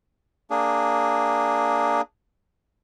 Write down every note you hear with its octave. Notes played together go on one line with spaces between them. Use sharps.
A#3 D4 G#4